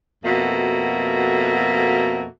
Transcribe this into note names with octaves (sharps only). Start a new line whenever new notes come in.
F2 B2 A#3 F#4 A4 E5